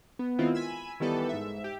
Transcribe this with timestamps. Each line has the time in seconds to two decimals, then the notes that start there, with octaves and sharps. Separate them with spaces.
0.19 B3
0.39 D#3 G#3 B3 C4 E4 F4
0.55 G#5 B5 E6
1.00 D#3 E3 G3 B3 A4 B4
1.29 G#2 E5
1.64 G4